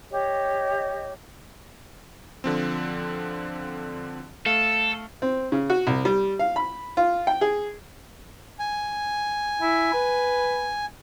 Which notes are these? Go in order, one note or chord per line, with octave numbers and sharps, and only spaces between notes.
G4 C#5 D#5
D3 F3 C4
A3 A4 F5
C4
C#3
F#4
C2
G3
F5
B5
F4
G5
G#4
G#5
E4
B4